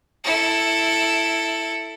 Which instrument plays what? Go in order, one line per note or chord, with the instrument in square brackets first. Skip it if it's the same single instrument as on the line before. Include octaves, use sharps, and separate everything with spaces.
[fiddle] E4 A4